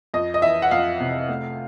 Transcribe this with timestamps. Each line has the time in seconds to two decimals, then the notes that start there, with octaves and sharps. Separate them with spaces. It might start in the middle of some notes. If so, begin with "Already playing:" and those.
0.14 F2 D#5
0.34 D#5
0.42 E3 E5
0.62 F#5
0.71 F2 F5
1.00 C3
1.29 A3